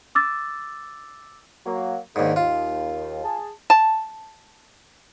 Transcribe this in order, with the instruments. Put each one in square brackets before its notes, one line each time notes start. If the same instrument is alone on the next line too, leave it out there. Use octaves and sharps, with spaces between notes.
[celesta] D6 E6 A6
[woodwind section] F#3 A#3
[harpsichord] D#2 G#2 [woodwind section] D#3 D4
[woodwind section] D#2 [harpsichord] F4
[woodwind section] G#4 A5
[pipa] A5